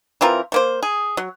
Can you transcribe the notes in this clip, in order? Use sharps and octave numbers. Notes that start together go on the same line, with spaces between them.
E3 C4 F4 A#4
A3 A#3 C5
G#4
F#3